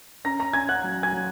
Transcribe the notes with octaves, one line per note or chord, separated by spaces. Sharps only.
C#4 A#5 A#6
A#5 A#6
C#4 G#5 G#6
F#5 F#6
F#3
G#5 G#6
F#3